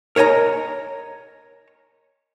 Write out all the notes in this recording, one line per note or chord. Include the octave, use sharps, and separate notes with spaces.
A#4 C#5 D#5 G5 A#5